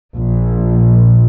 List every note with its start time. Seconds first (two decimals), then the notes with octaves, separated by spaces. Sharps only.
0.15 A#1